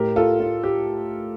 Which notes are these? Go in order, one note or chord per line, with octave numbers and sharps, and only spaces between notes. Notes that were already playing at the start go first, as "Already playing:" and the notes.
Already playing: A2 G4 A#4
F4 A4
F4
G4